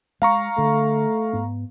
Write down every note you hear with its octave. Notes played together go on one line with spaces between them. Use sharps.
G#3 F5 A#5 C#6
D3 A3
G#2 B3